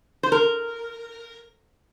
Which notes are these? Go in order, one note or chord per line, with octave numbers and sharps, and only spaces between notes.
C5
A#4